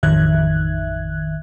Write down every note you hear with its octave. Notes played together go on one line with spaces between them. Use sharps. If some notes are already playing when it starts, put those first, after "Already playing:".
A1 F2 D#3 E5 F#6 G#6